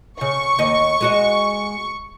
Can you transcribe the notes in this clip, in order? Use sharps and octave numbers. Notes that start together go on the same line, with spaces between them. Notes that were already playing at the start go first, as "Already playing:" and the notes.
C#3 C#6
D#2 D#5
G#3 F#4 D#5